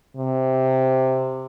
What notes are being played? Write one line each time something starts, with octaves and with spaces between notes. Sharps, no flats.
C3